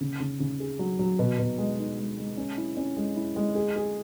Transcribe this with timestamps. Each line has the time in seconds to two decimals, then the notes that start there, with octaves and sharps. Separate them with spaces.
0.01 C#3
0.20 C#3
0.40 C#3
0.60 G#4
0.79 F#3
0.99 F#3
1.19 B2
1.39 B2
1.58 G#3
1.78 D#4
1.98 G#3
2.18 G#3
2.37 C#4
2.57 E4
2.77 C#4
2.97 G#3
3.16 E4
3.36 G#3
3.55 G#4
3.76 G#4